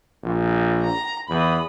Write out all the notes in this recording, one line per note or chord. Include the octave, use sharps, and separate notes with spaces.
A#1
A#5
E2 B5 D#6